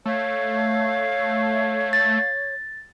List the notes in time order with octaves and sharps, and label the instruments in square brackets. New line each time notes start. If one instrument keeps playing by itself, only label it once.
[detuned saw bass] A3 [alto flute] C#5 [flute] F5
[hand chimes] A6